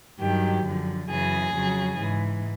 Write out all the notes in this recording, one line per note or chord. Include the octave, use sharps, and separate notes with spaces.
G2 D#3 F#3 G4
F#2 D3 F3
F#2 C#3 E3 G#4
F2 C#3 F#3
G#2 E3